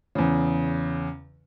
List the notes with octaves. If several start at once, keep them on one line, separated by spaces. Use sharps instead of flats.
E2 C#3